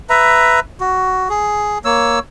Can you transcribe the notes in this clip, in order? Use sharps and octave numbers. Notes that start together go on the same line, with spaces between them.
B4 E5 A#5
F#4
G#4
A#3 C#5 E6